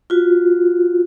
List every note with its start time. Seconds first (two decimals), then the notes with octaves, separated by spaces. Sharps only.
0.10 F4 F#4